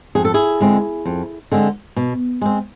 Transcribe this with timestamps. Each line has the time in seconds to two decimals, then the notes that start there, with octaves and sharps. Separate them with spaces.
0.15 F2 G#4
0.25 A4
0.34 E4 G#4
0.61 D3 G#3 C4
1.06 F2
1.52 D3 G#3 C4
1.96 B2
2.41 G#3 C4